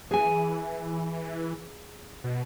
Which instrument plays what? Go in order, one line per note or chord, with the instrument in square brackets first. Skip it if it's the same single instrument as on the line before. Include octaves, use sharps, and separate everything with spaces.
[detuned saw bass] E3 [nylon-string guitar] G#4 G#5
[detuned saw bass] B2